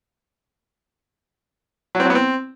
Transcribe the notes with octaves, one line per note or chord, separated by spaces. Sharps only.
F#3
C4
F#3
B3
C4